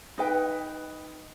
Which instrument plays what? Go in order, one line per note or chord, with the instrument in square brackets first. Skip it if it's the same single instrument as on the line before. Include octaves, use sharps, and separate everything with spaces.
[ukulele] D#4 B4 G5